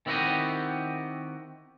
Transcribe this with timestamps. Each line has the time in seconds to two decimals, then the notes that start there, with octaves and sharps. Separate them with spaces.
0.06 D#3 C4 E4 F#4 G4 D#5